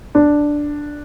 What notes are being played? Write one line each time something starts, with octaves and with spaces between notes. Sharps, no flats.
D4